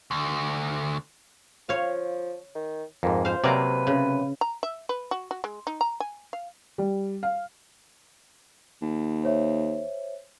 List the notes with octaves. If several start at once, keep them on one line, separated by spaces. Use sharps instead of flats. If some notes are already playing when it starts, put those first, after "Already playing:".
D2
F3 C#5 F5
D#3
F2 G#2 A#3
F3 C5 F5
C3 F#3 A#3 B4 D5 F5 A#5
C#3
A#5
E5
B4
F#4
F#4
G#3
D#4
A#5
G#5
F5
G3
F5
D#2
C5 C#5 E5